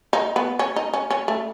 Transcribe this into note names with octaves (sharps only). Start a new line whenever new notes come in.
D#4
B3
C#4
D#4
C#4
C#4
A3